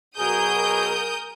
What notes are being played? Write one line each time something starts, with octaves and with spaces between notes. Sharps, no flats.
B2 F#3 G#4 A#4 D#6 G6